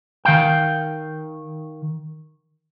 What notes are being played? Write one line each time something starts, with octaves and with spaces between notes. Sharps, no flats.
D#3 F5 G5